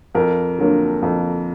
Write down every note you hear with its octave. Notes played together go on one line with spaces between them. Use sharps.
F2 A#4
D3 F#3 A#3
F2